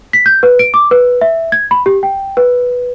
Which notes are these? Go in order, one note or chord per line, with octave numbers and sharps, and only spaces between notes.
B6
G6
B4
D7
D6
B4
E5
G#6
B5
G4
G5
B4